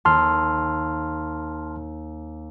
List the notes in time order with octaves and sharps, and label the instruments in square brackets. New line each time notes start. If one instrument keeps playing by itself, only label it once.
[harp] D#2 [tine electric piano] A5 C6 F6